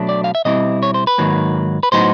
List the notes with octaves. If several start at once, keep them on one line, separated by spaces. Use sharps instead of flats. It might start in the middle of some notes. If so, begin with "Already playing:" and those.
Already playing: B2 F#3 A3 D4
D5
F5
E5
B2 G3 C4 E4 D#5
C#5
C5
B4
G#2 D#3 F#3 A#3
B4
A2 F#3 B3 D#4 C5